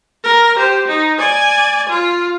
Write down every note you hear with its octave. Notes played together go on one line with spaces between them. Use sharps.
A#4
G4 C5
D#4
D5 G#5
F4